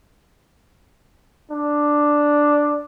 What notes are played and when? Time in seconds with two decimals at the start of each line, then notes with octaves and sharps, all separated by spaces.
1.51 D4